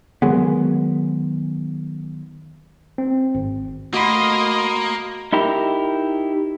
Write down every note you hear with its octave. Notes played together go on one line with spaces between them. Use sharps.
D#3 F#3 G#3 B3
C4
G#1
A3 A#3 F#4 D#5 B5 C6
D#4 E4 G4 A#4